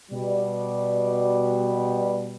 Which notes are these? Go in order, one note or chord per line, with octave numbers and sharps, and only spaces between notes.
B2 G3